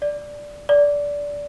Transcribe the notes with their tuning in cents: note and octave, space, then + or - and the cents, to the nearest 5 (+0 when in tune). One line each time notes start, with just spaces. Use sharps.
D5 +0
D5 -15